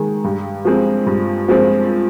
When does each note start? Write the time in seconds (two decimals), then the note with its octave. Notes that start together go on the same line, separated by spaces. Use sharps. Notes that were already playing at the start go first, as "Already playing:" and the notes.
Already playing: D#3 G#3
0.24 G2
0.65 F3 G#3 C4
1.06 G2
1.48 F3 G#3 C4